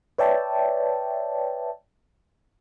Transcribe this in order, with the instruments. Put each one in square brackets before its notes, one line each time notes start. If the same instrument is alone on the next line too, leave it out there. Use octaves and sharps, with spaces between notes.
[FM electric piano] B4 C#5 D5 E5 G5 A5